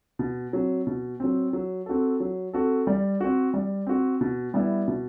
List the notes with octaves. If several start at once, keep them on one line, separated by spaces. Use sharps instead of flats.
B2
F#3 C4
B2
F#3 C4
F#3
C4 F#4 A4
F#3
C4 F#4 A4
G3
C4 F#4
G3
C4 F#4
B2
G3 B3 E4
B2